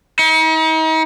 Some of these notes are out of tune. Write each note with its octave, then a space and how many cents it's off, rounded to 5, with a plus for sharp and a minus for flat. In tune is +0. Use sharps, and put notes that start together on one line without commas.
D#4 +40